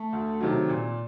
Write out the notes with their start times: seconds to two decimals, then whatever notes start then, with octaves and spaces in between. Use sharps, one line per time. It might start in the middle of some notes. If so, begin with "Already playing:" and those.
Already playing: A3
0.13 D2
0.41 C3 D#3 F#3
0.69 A#2